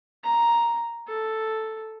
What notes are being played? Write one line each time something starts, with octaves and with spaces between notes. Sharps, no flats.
A#5
A4